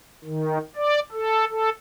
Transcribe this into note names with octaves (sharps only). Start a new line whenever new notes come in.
D#3
D5
A4
A4